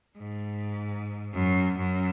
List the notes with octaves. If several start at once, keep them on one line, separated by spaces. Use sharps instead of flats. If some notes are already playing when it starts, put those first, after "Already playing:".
G#2
F#2
F#2